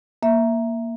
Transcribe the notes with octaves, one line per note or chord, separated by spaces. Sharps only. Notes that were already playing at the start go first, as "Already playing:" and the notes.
A#3 E5